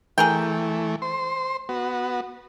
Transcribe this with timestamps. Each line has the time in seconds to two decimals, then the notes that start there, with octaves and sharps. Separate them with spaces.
0.18 E3 A3 G#4 A#4 G5
1.02 C5 C6
1.69 B3 F#4